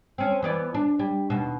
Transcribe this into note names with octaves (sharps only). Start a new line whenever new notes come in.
C4 C#4
E3 B3 D5
D4
G3
D#2 B2